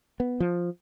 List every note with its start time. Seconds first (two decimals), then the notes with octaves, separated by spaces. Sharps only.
0.20 B3
0.40 F3